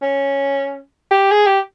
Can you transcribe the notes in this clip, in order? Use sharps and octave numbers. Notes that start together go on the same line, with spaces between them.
C#4
G4
G#4
G4